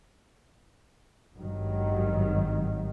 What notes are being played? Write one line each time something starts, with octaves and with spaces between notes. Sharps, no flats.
G#1 G2 D#3 F#3